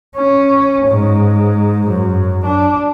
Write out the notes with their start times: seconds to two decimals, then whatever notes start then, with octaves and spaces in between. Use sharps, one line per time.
0.17 C#4
0.87 G#2
1.89 F#2
2.46 D4